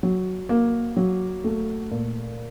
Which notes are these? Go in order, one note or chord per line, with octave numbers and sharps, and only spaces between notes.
F#3
A#3
F#3
A3
A#2